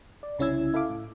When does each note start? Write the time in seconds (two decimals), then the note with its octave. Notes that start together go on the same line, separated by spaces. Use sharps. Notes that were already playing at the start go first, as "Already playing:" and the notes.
0.23 D5
0.39 C2 C#3 C#4 E4 E6 G#6
0.74 E4 A4 E5 F5 D6
0.89 A2